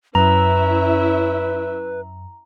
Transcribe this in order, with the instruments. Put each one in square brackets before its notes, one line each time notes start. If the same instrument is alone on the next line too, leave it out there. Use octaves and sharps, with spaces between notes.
[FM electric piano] F#2 [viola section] C#4 E4 E5 [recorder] B4 [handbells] A#5